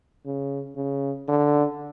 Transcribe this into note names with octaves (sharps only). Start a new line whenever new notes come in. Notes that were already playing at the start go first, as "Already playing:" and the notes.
C#3
C#3
D3